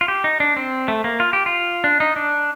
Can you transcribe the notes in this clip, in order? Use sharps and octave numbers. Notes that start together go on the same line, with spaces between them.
F4
G4
D#4
D4
C4
A3
A#3
F4
G4
F4
D4
D#4
D4